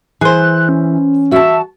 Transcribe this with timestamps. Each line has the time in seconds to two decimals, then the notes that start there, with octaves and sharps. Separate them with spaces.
0.21 E3 G#4 C5 F#6
0.69 C#4
1.32 F#4 E5 A5